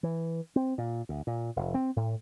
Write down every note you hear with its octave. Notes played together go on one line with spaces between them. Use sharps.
E3
C4
A#2
D2
A#2
F1
C4
A2